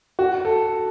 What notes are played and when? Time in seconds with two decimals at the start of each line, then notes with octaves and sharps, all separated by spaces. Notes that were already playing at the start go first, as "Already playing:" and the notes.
0.19 F#4
0.45 A4